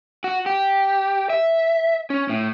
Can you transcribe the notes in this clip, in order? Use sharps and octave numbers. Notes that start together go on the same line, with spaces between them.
F#4
G4
E5
C#4
A2